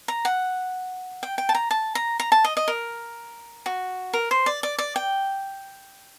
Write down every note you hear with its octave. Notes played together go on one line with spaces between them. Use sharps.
A#5
F#5
G5
G5
A5
A#5
A5
A#5
A#5
A5
D#5
D#5
A#4
F#4
A#4
C5
D5
D5
D5
G5